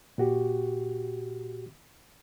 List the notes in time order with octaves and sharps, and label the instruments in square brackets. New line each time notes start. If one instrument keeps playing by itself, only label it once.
[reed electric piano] A#2 F#4 G4